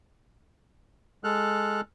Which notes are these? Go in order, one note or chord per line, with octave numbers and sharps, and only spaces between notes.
G#3 A4 F6 F#6